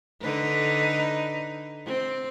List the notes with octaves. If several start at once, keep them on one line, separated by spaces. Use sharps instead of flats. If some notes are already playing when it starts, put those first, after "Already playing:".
D3 D#4 B4
C4